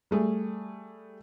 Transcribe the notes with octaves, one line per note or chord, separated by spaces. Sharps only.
G3 A3 G#4